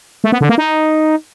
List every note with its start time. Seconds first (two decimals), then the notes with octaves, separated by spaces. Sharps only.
0.24 A3
0.32 B3
0.41 D3
0.49 A#3
0.58 D#4